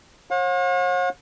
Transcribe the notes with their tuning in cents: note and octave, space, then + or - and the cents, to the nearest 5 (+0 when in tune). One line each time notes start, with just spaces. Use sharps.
C#5 -45 F#5 -45